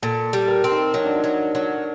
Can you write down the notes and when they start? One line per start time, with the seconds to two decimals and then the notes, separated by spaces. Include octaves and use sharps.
0.02 A#2 A4
0.33 G3
0.48 A#4
0.64 C4
0.72 D#4
0.94 F#3 D#4
1.05 D4
1.16 D#4
1.24 F#3
1.55 F#3